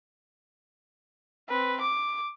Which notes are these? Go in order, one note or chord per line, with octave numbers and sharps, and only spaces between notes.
C4 B4
D6